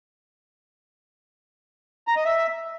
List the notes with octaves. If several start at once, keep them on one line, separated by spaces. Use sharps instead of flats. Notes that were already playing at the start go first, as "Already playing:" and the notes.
A#5
D#5
E5